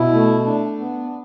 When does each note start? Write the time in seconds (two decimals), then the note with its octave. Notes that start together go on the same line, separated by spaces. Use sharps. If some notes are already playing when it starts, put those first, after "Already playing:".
Already playing: B2 E4
0.13 A3
0.46 D4
0.79 B3